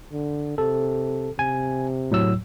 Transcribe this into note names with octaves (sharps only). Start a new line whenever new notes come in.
D3
C3 A4
C3 G#5
A2 F#3 E6